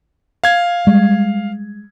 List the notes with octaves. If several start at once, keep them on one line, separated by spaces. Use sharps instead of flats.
F5 G#6
G3 G#3